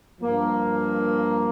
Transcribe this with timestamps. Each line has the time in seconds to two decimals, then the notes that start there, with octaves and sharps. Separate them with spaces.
0.21 G2 F3 A#3